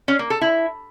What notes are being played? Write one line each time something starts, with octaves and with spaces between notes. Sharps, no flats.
C#4
A#3
A4
E4